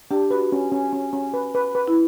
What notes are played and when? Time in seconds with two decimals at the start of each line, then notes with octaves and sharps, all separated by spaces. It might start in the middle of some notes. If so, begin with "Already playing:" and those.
0.11 D4 G4
0.31 F#4 B4
0.52 C#4
0.72 C#4
0.93 C#4
1.13 C#4
1.34 B4
1.55 B4
1.75 B4
1.88 E4